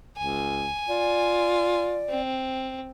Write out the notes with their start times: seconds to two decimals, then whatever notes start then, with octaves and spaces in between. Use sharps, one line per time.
0.17 C#2 G#5
0.88 F4 D5
2.09 C4